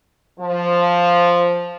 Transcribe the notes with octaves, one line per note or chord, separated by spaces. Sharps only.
F3